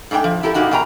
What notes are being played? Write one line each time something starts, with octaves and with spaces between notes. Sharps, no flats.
G#2 A3 D4 A4 G5
F3
E4 G4 A4 A#4
A#2 A#3 D#4 F#4 G4
B2 G#4 A#4 G5 G#5 A#5